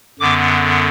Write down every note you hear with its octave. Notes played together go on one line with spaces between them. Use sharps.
F#2 D3 B3 D6